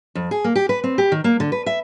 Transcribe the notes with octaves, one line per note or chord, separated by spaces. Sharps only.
F2
G#4
A#3
G4
B4
C4
G4
D#3
A#3
D3
B4
E5